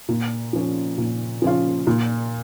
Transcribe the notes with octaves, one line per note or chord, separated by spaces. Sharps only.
A#2
F3 C#4 F4
A#2
F3 C#4 F4
A#2